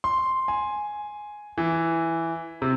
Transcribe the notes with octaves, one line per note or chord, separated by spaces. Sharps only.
C6
G#5
E3
C3